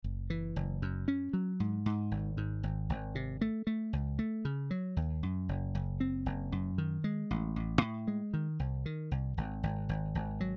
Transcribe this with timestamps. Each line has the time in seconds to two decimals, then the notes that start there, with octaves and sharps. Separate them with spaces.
0.04 F#1
0.30 E3
0.56 F#1
0.82 F#2
1.08 C#4
1.33 F#3
1.60 G#2
1.86 G#2
2.11 G#1
2.37 G#2
2.63 G#1
2.89 G#1
3.15 C3
3.41 A3
3.67 A3
3.93 C#2
4.19 A3
4.45 C#3
4.71 F#3
4.97 D#2
5.23 F#2
5.49 F#1
5.75 F#1
6.00 C4
6.26 F#1
6.52 F#2
6.78 D#3
7.04 G#3
7.31 A1
7.56 A1
7.82 A2
8.08 G#3
8.34 D#3
8.59 C2
8.86 D#3
9.11 C2
9.37 G#1
9.63 G#1
9.89 G#1
10.15 G#1
10.41 F#3